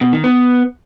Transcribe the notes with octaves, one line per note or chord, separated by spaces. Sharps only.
B2
D#3
B3